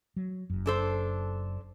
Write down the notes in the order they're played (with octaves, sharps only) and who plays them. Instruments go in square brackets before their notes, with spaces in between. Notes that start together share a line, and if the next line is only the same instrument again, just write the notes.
[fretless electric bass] F#3
F#1 F#2
[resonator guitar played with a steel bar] D4 A4 C5